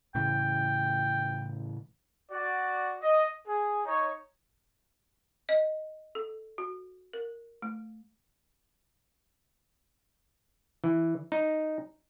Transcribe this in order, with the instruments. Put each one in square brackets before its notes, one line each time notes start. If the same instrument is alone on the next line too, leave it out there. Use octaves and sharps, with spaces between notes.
[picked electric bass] A2 C#3 E3 [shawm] G5
[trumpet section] F#4 D5
D#5
G#4
D#4 C#5
[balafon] D#5
A4
F#4
A#4
A3
[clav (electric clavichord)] E3
D#4